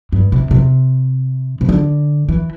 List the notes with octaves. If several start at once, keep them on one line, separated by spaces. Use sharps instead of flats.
G2
C3
C3
C3
D3
E3